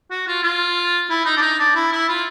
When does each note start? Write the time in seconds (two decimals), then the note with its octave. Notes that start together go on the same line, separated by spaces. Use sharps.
0.11 F#4
0.28 F4
0.43 F4
1.10 E4
1.25 D#4
1.36 D4
1.42 D#4
1.59 D4
1.75 E4
1.92 E4
2.08 F4